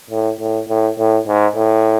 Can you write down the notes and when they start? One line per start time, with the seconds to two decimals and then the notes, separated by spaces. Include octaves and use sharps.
0.10 A2
0.40 A2
0.68 A2
0.98 A2
1.27 G#2
1.56 A2